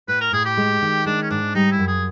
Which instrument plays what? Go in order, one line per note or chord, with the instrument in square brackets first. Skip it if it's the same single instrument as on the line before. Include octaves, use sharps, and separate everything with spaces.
[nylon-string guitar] A2 [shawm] B4
[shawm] A#4
[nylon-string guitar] A2 [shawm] G#4
[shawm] G4
[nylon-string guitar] G#3
D#3
[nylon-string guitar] G#3 [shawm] D4
[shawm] C#4
[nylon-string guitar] G#2 [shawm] D4
[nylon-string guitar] G3 [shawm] D#4
[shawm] E4
[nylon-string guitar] F#2
[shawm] G#4